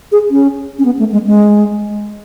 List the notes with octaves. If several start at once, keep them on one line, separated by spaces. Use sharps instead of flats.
G#4
C#4
C#4
B3
A3
G#3
G#3